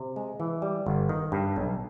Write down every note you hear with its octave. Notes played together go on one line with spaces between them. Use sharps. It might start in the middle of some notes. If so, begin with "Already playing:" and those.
Already playing: C3
G#3
E3
G3
G1
D#3
G2
B1